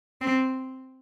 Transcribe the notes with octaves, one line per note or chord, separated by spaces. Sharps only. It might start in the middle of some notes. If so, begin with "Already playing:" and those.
C4